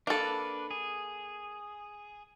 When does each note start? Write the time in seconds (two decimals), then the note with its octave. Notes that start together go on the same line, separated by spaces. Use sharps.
0.07 A#3 D4 A4 B4
0.71 G#4